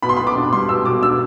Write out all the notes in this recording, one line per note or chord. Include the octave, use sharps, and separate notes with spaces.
B2 B5
C6
B2 B5
D6
D4
G3 C6
B2 E6
B2 D6
D4 E6